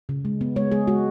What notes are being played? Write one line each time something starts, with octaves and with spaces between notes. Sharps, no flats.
C#3
G#3
B3
G#3 C#5
G#3 G#4
G#3 F#4